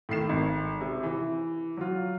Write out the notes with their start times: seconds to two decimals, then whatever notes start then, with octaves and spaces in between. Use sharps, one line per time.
0.09 A2 D#3 C7 E7
0.29 G#1
0.81 C3
1.03 E3
1.77 F#3 F4